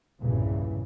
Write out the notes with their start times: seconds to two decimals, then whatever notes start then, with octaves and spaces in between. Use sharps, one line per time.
0.20 B1 E2 G2 A#2 C#3 E3